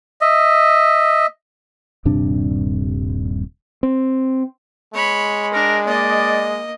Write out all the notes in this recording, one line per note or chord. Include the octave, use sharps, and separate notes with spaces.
D#5 E5
D#1 G2 C3 D4
C4
G#3 C#5 B5
D4 A#4
A#3 D5 D#5